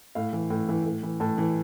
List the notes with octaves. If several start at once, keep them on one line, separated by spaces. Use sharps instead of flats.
A2 F5
E3
A2
E3
A2
E3
A2 A5
E3